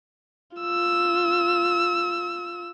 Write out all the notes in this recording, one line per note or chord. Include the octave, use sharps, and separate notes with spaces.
F4 E6